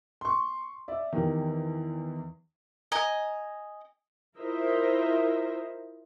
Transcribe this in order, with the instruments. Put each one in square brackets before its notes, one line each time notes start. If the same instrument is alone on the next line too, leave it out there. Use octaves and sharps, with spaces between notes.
[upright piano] C6 C#6
D5 E5
E2 D#3 G4
[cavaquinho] D#5 G#5 A#5
[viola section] E4 F4 A#4 C5 D#5 E5